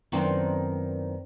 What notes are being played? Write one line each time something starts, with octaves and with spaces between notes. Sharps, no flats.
F#2 D#3 B3 C4 D4 E4